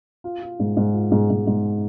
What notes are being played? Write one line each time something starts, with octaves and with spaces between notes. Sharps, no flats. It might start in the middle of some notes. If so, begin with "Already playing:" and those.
F4
F4
G#2
G#2
F4
G#2
G#2
G#2